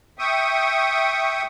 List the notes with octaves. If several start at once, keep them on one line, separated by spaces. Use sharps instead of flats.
E5 G5 C#6 D#6